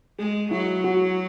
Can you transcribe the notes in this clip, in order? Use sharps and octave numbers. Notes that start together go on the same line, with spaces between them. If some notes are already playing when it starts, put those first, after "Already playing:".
G#3 G#4
F#3 E4
F#4